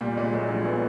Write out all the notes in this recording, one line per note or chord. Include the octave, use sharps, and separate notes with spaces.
A#2 G3
A#2 G#3
F#3 A3
A#1 G3
B3